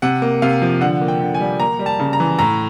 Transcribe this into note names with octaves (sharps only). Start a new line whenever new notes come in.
C3 F#5
A#3
C3 F5
F3
D3 F#5
A#3
G5
D3
G#5
G3
A#3 A#5
G3
A5
C#3
A#5
E3
A2 A#5